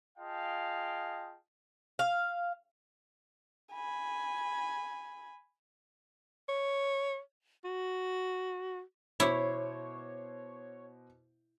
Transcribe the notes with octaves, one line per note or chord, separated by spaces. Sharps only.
F4 G#4 D#5 F5 G5 A5
F5
G#5 B5
C#5
F#4
B2 E4 C5 C#5 D6